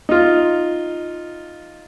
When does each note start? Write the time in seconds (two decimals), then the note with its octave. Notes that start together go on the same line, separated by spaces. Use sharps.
0.09 D#4 F4